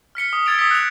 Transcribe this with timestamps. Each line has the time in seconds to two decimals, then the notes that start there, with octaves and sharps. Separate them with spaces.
0.15 F6 B6 C#7 G7
0.33 D#6
0.46 E6 G#6 A6 D7 F7 G7
0.59 D#6 B6
0.71 F#6 F7